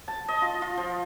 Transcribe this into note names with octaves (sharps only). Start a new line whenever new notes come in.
A5
D#5
F4
F4
F3